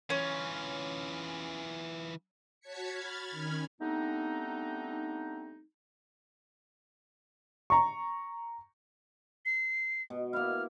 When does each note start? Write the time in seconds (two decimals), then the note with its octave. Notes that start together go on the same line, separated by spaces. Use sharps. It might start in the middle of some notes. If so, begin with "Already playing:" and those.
0.10 E3 C#4 F4
2.60 F#4 C#5 A5 G#6 B6 C#7
2.91 B5 F6 G#6 A6
3.31 D#3 C#4 B5 F6 G#6
3.81 G3 A3 B3 C4 D4 D#4
7.70 A#5 C#6
9.46 C7
10.10 B2
10.33 A#3 E4 F6